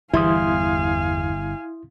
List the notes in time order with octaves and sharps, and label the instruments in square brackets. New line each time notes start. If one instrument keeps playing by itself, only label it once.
[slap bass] G1 G3 [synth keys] E2 [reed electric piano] E4 C6 D#6 [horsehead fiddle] F5 G#5